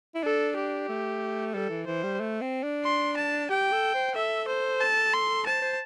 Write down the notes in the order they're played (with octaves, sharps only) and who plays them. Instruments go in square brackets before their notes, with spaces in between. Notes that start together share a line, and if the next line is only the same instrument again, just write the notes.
[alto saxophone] E4
[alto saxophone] D4 [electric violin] A4
[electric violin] G4
[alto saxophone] A3
[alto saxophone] G3 [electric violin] A4
[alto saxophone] E3
[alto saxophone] E3 [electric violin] C5
[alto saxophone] G3
A3
C4
D4
[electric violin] C6
A5
[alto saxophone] G4 [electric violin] G5
[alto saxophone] A4
C5
[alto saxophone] A4 [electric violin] E5
[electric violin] C5
A5
C6
[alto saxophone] C5 [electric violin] A5
[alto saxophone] C5